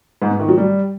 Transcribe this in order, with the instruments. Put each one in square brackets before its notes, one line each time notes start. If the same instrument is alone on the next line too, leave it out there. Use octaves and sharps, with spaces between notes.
[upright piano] G#2
B3
D#3
F#3
G3